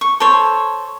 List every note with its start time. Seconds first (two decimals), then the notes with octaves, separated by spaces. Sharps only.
0.01 C#6
0.20 A4 C5 C#5